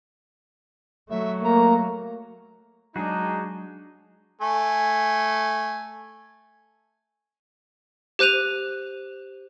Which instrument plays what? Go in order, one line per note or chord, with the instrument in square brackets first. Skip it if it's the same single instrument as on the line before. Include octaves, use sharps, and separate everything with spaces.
[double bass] F#3 A3 [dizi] E5
[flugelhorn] A#3 [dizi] A#5
[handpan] F#3 G#3 [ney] D4 [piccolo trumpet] D#4 [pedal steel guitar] F#4 G#4
[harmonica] A3 G#5
[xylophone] G4 C5 F#6 D#7 F7